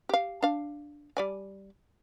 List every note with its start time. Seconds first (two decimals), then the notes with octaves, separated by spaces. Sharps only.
0.09 G4 F5
0.43 D4 F5
1.17 G3 D5 G#5